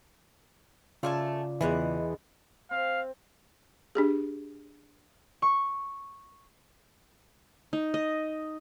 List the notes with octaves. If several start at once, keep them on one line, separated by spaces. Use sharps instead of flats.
C#3 A3 F4 D5 G#5 A5
E2 B2 E3 G#3 F#5
C4 F5
D4 G4 G#4
C#6
D#4
D#5